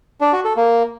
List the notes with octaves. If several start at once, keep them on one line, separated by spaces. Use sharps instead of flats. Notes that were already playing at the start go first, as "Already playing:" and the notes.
D4
F#4
A4
A#3